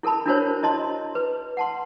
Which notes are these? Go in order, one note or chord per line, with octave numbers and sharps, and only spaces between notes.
E4 A4 A#4 A5 B5
D4 E4 F#4 A#4 C5 C#5
E4 D#5 A5 C6
B4
F#5 A5 C6